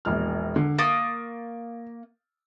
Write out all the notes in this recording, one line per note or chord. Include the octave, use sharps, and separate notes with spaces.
E1 A#1 F6
D3
A#3 C#6 D#6 A6